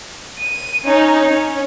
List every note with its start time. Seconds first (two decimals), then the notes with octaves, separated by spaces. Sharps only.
0.39 D#7
0.84 C#4 D#4
1.27 C#4